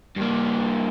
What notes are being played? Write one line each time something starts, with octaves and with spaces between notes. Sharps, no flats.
G2 A#3